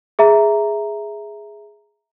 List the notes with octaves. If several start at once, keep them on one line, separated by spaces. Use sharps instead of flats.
G#4 E5 A#5